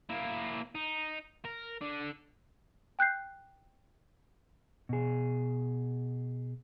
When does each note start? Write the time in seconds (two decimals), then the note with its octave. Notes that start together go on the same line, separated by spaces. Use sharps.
0.09 A#3 E4
0.75 D#4
1.45 A#4
1.81 D3
2.99 G5 F#6 G6 C7
4.89 B2 G#4